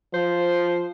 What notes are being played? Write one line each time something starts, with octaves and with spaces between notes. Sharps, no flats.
F3 C5